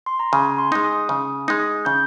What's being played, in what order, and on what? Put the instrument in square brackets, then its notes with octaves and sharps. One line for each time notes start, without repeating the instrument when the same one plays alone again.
[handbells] C6
A#5
[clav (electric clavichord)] C#3 [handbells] G#5
[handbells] C6
[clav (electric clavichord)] G#3 D#4
[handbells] D#6
[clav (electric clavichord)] C#3
G#3 D#4
[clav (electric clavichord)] C#3 [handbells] G6